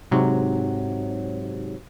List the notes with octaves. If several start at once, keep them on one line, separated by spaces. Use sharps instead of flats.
G#2 C3 F#3